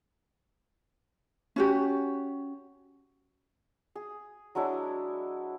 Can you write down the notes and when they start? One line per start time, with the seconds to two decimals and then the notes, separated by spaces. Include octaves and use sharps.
1.56 C#4 F#4 G4
3.95 G#4
4.55 F#3 G#3 D4 E4